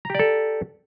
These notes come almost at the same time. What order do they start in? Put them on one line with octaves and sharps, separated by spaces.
A#5 G4 D5 A4